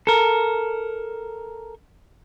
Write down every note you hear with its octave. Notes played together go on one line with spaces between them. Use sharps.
A4 A#4